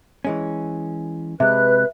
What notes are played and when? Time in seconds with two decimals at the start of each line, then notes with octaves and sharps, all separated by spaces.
0.25 E3 G#3 C#4
1.40 C3 G#3 B4 E5 F#6